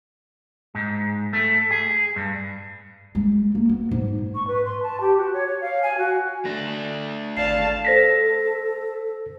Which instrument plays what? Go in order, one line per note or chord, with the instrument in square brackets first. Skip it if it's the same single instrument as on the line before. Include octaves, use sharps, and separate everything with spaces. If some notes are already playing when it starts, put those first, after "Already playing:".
[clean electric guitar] G#2
A3
G#4
G2
[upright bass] G#3
A#3
B3
G#2
[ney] C#6
B4
C6
A5
G4
F#4
C#5
C#5
F5
G#5
F#4
[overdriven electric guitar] A3 D4 [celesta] A#6
[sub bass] G#1 [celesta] D5 C7 [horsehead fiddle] F5 A5
[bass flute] A4 [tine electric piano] C5 A#6 B6